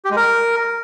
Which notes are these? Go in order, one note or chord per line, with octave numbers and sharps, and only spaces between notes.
G4
G#3
A#4